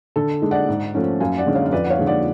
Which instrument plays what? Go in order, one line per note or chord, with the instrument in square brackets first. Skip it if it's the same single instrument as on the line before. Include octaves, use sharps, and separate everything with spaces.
[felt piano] D3 A4
G#3 D4
D5 F#5
G#2
F3 A3 C#4
F#2 F5 G#5
D5 F#5
D3 G#3 C#4
C#5 F5
F5
F2 B4 D5
F#5
C#5 F5
D3 G#3
D5 F#5